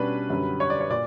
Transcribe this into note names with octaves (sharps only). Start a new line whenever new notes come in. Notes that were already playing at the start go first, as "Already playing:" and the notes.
Already playing: B2 G3 C#4 D4 B4
F#2 D3 G3
C#5
D5
C#5
A#2 D5